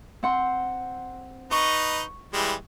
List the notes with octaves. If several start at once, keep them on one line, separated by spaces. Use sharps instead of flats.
C4 F#5 C6
D#4 B4 D#5 C#6
E3 G3 G#3